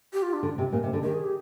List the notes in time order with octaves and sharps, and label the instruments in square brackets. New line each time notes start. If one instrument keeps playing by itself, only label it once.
[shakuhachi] G4
F4
D4
[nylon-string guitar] D3
C3
A#2
C3
D3
[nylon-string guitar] D#3 [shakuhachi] G4
[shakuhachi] G#4
G4